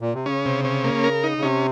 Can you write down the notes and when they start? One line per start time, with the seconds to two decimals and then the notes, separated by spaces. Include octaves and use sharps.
0.01 A#2
0.14 C3
0.26 C#3 C#4
0.45 C3
0.65 C#4
0.84 A#3
1.04 A#4
1.24 D#4
1.37 C#3
1.42 C3 C#4